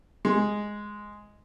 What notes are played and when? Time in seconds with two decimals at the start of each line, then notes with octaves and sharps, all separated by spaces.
0.25 G#3